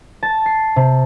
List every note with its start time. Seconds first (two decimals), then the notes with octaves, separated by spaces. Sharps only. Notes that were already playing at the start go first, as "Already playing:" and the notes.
0.23 A5
0.46 C7
0.76 C3